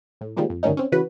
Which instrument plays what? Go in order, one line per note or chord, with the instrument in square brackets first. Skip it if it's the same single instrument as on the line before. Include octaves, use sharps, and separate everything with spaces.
[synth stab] A2
D#3 F3 G3 G#3 A#3
F2
G2 D3 D#3 A3 C#4 D#4
C4 C#4
C#3 E3 F#4 B4